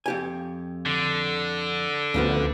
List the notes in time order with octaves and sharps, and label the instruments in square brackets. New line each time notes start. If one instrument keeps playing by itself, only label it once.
[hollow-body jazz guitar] F2 G4 G#5
[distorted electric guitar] D3
[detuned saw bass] D2 [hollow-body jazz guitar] C#3 F3 B3